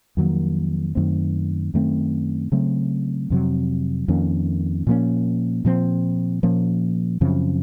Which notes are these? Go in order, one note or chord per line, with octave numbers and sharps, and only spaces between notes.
F2 D#3 F#3 A#3
F#2 D#3 A3 C4
F#2 D#3 A3 C4
C#3 F#3 A3 C4
F2 C3 F#3
F2 D#3 A#3 C#4
A#2 F3 A#3 C#4
A#2 F3 C4
A#2 F3 A#3 C#4
F#2 C#3 F3 C4